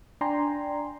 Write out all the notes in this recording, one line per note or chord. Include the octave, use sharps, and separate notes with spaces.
D4 D5 G5 G#5 A#5 C6